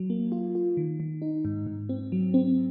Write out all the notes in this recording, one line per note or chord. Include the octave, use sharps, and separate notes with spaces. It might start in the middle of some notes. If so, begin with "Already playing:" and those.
Already playing: F#3
A#3
F4
F4
D#3
D#3
D#4
G#2
G#2
C4
F#3
C4